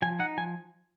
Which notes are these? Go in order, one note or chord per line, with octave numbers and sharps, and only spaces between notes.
F3 G#5
D#4 F#5
F3 G#5